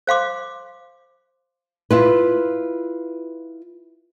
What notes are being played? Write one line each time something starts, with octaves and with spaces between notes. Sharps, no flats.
C5 F5 C6 D6
E4 F4 B4